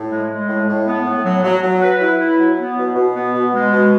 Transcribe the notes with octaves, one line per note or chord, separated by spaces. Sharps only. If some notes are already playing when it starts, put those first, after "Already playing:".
Already playing: A2
G#3
G#3
A2
A2
B3
A2
F#3
F#3
F#3
B4
E4
E4
F#3
B3
B2
B2
B3
B2
G#3
B2